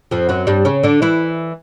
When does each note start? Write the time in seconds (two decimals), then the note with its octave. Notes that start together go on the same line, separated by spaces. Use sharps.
0.11 F2 F3
0.29 F#2 F#3
0.47 G2 G3
0.65 C#3 C#4
0.83 D3 D4
1.02 E3 E4